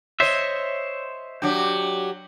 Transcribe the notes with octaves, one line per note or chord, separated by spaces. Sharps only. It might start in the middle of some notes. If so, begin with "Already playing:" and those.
C5 C#5 D#5 E5
F#3 D4 G4